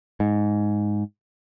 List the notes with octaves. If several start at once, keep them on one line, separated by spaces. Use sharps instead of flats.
G#2